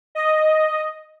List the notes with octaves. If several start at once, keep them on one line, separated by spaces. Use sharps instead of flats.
D#5